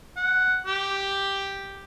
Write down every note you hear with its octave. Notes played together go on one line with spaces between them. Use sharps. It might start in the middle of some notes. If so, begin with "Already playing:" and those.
F#5
G4